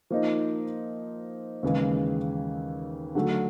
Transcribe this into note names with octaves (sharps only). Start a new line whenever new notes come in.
F3 A#3 D#4
D#2 C#3 E3 G#3
D3 F#3 A3